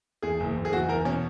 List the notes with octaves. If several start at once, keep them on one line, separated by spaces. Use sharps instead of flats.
E2 G#4
F#1
F#1
G#4
E2 F#4
E2 A#4
B2 C#4